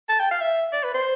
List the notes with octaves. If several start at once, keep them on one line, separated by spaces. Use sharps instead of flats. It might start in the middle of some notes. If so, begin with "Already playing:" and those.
A5
G5
F5
E5
D5
B4
C5